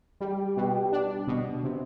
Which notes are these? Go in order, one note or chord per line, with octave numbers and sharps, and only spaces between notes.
G3 G4
B2
D4
B2
C3